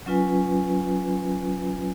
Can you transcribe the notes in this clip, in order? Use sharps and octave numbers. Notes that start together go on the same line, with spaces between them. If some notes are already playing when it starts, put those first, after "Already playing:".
F#3 C#4 F4 B4 G#5